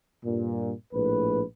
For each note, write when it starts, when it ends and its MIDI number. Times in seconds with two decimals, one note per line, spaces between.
0.24 0.72 43
0.24 0.72 46
0.93 1.42 34
0.93 1.42 45
0.93 1.42 71